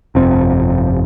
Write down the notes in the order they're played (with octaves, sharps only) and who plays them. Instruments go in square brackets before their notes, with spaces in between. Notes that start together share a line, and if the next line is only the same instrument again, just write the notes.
[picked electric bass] G1 F2 C3 C4